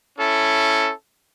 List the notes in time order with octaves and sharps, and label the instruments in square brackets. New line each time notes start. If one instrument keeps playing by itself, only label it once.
[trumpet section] C#4 E4 A4